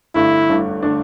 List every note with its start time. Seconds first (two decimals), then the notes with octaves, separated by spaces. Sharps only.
0.15 G1 G2 D3 A3 D4 E4
0.49 G1 G2 D3 A3 D4
0.83 D3 A3 D4